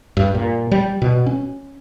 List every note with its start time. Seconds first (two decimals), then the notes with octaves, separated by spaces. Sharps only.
0.17 G2
0.35 A#2
0.71 G3
1.02 B2
1.26 C#4